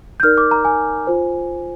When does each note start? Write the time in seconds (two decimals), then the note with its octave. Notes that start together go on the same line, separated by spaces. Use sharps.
0.20 G6
0.23 D#4 A#4 D5 F6
0.38 D6
0.51 A#5
0.65 G#5
1.07 F4 C5